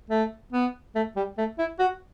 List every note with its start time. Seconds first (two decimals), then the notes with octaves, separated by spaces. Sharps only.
0.10 A3
0.53 B3
0.95 A3
1.16 G3
1.38 A3
1.59 E4
1.79 F#4